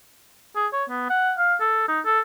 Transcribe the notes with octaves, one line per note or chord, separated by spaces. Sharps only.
G#4
C#5
B3
F#5
F5
A4
D#4
A4